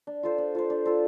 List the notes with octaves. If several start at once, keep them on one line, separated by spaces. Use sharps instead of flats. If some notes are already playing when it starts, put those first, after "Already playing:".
D4
F4 A4 C5
D4
F4 A4 C5
D4
F4 A4 C5